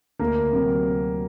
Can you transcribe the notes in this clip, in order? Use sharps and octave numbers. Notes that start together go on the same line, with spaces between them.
D2 A#3 A#4
C3 F#3 C4